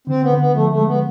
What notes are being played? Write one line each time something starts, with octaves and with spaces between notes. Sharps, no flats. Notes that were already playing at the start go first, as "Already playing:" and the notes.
D3 C4
B3
D3
B3
F3 A3
A3
G#3
B3